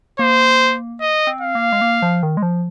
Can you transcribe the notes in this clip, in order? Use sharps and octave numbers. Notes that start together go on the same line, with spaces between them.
A#3 C5
D#5
C4
F5
A#3
G#3
A#3
F3
D#3
G#3
F3